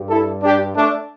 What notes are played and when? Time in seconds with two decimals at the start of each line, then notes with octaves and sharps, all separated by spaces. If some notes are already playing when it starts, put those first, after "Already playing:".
Already playing: G2 G3
0.09 E4 A4
0.43 D4 G4
0.76 A3 D4